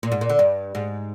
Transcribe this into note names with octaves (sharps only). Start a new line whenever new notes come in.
A#2
G#2
A#2
D3
G2
G#2